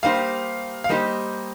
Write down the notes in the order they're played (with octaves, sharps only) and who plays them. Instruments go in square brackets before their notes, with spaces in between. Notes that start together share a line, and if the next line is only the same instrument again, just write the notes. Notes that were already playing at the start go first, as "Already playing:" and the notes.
[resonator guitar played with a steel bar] G3 A#3 D#4 G4 C5 [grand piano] F5
[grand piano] F5
[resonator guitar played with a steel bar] G3 A#3 D#4 G4 C5 [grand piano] D#5